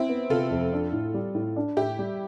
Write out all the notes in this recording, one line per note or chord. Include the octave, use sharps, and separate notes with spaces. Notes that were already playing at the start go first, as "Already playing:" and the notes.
Already playing: C4 E4
B3
C3 F4 A4
F2
D4
A2
G3
A2
D4
A2 E4 G4
G3